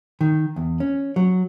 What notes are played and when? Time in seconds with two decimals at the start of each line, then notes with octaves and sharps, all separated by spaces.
0.21 D#3
0.56 E2
0.80 C#4
1.16 F#3